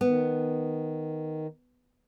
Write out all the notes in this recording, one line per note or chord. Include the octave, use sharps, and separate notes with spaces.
D#3 B3